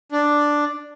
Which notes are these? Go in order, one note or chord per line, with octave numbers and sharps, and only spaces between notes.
D4